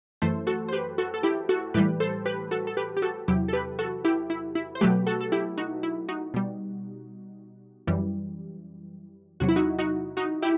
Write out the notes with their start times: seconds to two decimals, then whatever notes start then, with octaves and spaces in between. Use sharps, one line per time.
0.22 F#2 E3 A3 A4 C5
0.47 F#4 A4
0.68 C5
0.73 G4 B4
0.98 F#4 A4
1.14 A4
1.23 E4 G4
1.49 F#4 A4
1.74 A2 E3 G3 G4 B4
2.00 A4 C5
2.25 G4 B4
2.51 F#4 A4
2.67 A4
2.77 G4 B4
2.97 G4
3.02 F#4 A4
3.28 E2 C3 F#3 E4 G4
3.48 A4
3.53 G4 B4
3.79 F#4 A4
4.04 E4 G4
4.30 E4
4.55 E4
4.75 C5
4.81 B2 F#3 A3 G4 B4
5.06 F#4 A4
5.21 A4
5.32 E4 G4
5.58 D#4 F#4
5.83 E4
6.09 D#4 F#4
6.34 B2 G3
7.87 F#2 E3 G3
9.40 E2 C3 F#3 F#4
9.48 E4
9.56 D#4 F#4
9.79 D#4 F#4
10.17 D#4 F#4
10.42 E4 G4